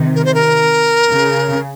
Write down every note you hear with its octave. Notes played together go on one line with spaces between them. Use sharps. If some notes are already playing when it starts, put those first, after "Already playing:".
Already playing: C3 D#3
A#4
C5
A#4
C#3